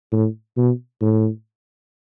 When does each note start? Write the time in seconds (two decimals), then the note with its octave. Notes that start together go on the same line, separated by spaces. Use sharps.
0.12 A2
0.57 B2
1.01 A2